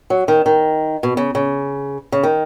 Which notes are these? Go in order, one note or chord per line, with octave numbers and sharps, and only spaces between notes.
F#3
D#3
D#3
B2
C#3
C#3
C#3
D#3